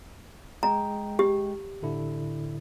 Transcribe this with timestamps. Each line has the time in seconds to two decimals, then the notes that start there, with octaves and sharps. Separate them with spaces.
0.63 G#3 G5 A#5
1.19 G4
1.82 A2 D3 E4